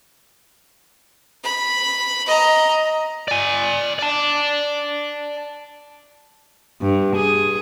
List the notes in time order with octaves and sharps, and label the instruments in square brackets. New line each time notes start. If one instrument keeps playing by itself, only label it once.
[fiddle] B5
D#5 A#5
[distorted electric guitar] D5 G#5
D5 A5
[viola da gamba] G2
G#4